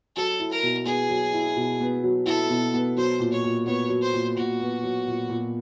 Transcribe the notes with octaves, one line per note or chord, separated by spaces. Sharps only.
F#3 A4
E4
A#4
B2
B3 G#4
F#3
E4
B2
B3
F#3
E4 A4
B2
B3
F#3 C5
A#2
C#5
A#2
B3 C#5
F#3
C5
A#2
A#2 F#4
B3
F#3
A#2
A#2